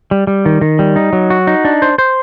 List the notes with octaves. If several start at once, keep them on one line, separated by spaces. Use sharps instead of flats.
G3
G3
D#3
D#3
G3
D#4
F#3
F#4
D#4
D4
C5
C5